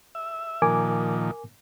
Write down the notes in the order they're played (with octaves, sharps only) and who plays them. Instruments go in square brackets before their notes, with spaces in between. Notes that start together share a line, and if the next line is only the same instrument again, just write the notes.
[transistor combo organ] E5
[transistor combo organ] A#2 D#3 F3 [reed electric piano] A#4 G#5 D6